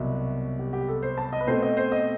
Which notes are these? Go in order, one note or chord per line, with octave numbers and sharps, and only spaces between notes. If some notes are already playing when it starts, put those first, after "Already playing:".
Already playing: C2 B2 F#3 E5
G4
G4
A4
C5
A5
D#5
B4
B2 A3 C4 C5
D#5
C5
D#5